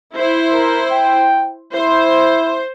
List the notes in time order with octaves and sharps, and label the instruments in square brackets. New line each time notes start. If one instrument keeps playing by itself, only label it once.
[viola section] E4 C5
[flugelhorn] A#4
G5
[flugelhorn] E4 [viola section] C5